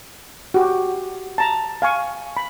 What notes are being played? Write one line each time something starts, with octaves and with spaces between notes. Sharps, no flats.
F#4 G4
A5 A#5
F5 G#5 C#6
B5